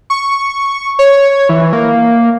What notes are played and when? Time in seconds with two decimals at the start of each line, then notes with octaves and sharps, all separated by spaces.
0.10 C#6
0.99 C#5
1.49 E3
1.73 A#3